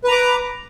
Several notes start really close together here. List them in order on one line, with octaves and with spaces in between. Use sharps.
B4 A#5 D6